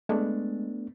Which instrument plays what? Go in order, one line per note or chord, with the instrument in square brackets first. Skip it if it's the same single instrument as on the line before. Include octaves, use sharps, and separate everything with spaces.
[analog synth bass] G#3 [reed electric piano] A3 B3 D4